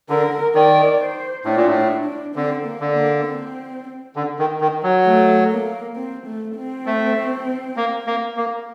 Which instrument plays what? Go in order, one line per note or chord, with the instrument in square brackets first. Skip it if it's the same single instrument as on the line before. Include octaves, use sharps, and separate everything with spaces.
[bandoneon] D3 [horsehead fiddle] A#4
[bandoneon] D#3 [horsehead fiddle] D5
[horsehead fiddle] C5
[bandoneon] A2 [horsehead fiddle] D4
[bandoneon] A#2
A2
[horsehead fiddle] D4
D4
[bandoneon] D3 [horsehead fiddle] C4
[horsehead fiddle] A#3
[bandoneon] D3
[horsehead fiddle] A#3
C4
[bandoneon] D3
D#3
D#3
F#3
[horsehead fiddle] A3
A#3
C4
A3
C4
[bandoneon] A3
A#3
A#3
A#3